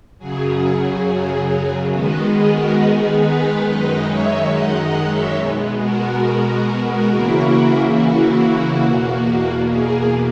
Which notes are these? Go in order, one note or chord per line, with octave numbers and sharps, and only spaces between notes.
F#2 C#3 F#3 G#4
D#3 G#3 B3 D#4 F#4
G#4
F#4 A#4
G#4
G#4 B4
F#2 D#3 G#3 D#4 B4 D#5
C#5 E5
D#5 F#5
D#5 F#5
C#5 E5
B2 G#3 B3
F#4 A#4
C#3 E3 A#3 E4
F#4
E2 B2 A#3
G#4